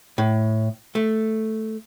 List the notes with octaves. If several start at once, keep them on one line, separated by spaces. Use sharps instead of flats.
A2
A3